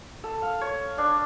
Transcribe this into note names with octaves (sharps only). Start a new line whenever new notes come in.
A4
F5
C#5
D4